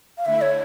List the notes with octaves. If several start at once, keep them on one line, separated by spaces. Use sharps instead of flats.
F5
D3 A3 E4 E5
C#5